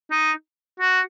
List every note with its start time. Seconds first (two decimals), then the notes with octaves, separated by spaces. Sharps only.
0.11 D#4
0.80 F#4